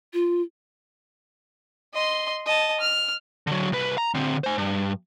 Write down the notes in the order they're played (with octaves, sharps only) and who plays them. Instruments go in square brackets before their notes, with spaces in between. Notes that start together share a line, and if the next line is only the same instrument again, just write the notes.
[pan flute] F4
[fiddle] D#5 C6
D#5 A5
F6
[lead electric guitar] D3 F#3
C2 B4
A#5
D3 C4
C5 G#5
G2